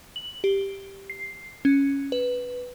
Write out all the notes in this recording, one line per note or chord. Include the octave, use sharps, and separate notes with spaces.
F#7
G4
C7
C#4
B4